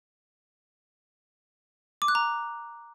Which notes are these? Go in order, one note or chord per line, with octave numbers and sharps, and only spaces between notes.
D6
F#6
A#5